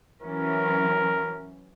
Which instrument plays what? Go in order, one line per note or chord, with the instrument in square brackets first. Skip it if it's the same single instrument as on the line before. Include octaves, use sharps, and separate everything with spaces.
[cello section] E3 F#3 C#4 [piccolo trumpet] A#4